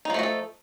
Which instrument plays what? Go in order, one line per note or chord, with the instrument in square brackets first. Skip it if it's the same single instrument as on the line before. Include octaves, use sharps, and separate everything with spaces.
[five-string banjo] D#4
F3
A3
F#4
A4